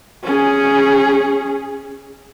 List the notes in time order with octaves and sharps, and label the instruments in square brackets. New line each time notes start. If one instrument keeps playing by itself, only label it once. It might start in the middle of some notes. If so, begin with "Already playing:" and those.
[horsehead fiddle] C#4 G#4